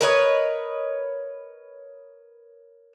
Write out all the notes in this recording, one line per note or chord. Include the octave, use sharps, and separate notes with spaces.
A#4 B4 C#5 D#5